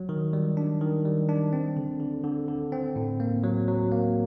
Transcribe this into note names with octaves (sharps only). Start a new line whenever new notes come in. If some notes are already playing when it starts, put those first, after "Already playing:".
Already playing: F#3
D#3
G3
D4
D#3
G3
D4
C4
D3
D3
D3
D3
C4
A2
A#3
F#3
F#3
A#3